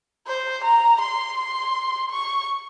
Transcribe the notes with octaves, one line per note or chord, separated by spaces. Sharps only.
C5
A#5
C6
C6
C#6